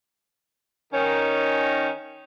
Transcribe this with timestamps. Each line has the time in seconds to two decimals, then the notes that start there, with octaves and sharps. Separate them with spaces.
0.92 D#3 C#4 D#4